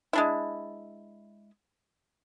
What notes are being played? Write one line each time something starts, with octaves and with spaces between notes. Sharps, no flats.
G#3 D4 E4